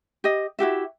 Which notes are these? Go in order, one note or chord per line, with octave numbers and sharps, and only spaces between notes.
G4 D#5
E4 F#4 G4 E5